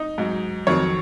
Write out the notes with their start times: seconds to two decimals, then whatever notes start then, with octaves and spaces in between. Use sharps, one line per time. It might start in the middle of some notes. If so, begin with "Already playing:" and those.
Already playing: D#4
0.18 G#2 F#3
0.67 F2 D#3 F#3 C#5